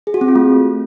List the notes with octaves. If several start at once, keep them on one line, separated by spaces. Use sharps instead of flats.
G#4
F#4
C4
F4
A3